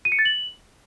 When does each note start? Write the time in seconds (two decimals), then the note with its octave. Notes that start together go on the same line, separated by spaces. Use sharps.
0.05 D#7
0.12 C#7
0.19 A6
0.25 F#7